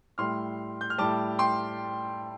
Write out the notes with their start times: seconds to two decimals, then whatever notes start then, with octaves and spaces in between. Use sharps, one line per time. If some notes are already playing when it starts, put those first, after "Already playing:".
0.18 A2 G3 C6 F6
0.81 G6
0.90 F6
0.98 A2 G3 A5 D6
1.39 G5 C6